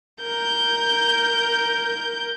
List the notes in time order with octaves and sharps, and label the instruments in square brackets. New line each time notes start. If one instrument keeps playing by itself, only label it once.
[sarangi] A#4 [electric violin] G6